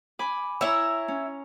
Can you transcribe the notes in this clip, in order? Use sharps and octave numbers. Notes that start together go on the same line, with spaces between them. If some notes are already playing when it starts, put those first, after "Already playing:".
G#5 B5 D6
E4 C#5 E5 A#5
C#4